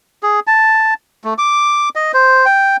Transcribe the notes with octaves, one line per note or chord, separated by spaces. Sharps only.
G#4
A5
A3
D6
D#5
C5
G5